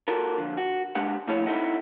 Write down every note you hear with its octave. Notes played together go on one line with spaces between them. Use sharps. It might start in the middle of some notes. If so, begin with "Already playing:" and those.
F4 F#4 A4 A#4
F2 D3
F#4
G#3 D4 G4 F#5
A#2 F3 A3 E4 G#4 C#5
C4 D#4 E4 A4 D#5 F#5